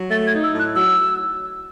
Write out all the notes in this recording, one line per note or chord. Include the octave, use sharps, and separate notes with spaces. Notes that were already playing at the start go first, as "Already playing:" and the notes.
Already playing: F#3
A3 A6
G#6
D#4
E6
A2
F#6
F#3 E6